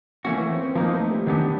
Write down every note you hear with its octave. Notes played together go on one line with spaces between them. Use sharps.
E3 A3 A#3 C#4 F#4
B3
C4
C4
F3 A#3 B3 D#4
A3
G3
D#3 F#3 B3 D4 G4